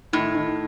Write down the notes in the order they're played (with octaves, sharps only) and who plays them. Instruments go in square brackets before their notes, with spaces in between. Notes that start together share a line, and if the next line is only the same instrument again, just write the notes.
[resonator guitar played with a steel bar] A2 [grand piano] D#3
[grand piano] D#3